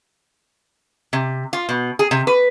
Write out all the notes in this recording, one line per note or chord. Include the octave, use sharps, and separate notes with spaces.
C3
F4
B2
G#4
C3
B4